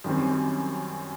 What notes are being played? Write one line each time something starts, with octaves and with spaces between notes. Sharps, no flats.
F#2 D#3 G3 C4